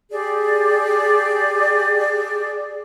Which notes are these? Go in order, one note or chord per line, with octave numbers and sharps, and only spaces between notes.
G4 G#4 D5